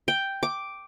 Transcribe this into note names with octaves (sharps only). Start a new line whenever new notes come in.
G5
D6